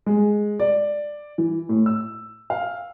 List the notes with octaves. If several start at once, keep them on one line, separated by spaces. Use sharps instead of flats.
G#3
D5
E3
A2
E6
F5